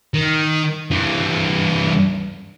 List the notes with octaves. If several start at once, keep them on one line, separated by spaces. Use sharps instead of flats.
D#3
G2 E3